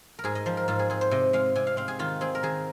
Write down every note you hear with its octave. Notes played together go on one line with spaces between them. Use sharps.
A#4
G#2 G#4
D#5
F3 C5
A#4
G#2 F4
G#4
C4 G#4
C5
C3 D#5
G#3 F5
C3 G#5
F5
C4 F5
G#4
D#3 F4
C4 G#4
A#4
D#3 G#4